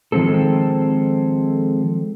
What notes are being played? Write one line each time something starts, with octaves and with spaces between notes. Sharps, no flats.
D#3 F3 G#3 C4 A4